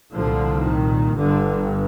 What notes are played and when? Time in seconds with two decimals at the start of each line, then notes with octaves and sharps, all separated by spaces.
0.14 C2 A#2 D3 F3
0.65 D#3
1.16 G1 G2 D3